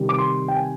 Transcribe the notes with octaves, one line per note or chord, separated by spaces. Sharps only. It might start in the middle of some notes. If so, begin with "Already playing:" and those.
Already playing: C3 D#3 G3
D6
C6
G5
G#5